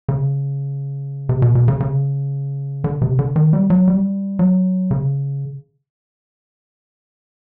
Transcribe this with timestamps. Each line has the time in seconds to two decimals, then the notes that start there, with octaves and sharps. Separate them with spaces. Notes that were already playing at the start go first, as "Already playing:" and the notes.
0.09 C#3
1.29 C3
1.42 B2
1.55 B2
1.68 C#3
1.80 C#3
2.84 D3
3.02 C3
3.19 D3
3.36 D#3
3.53 G3
3.70 F#3
3.88 G3
4.39 F#3
4.91 C#3